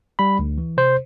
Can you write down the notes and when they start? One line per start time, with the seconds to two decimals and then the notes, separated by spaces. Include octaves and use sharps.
0.19 G3 B5
0.39 D2
0.58 E3
0.77 C3 C5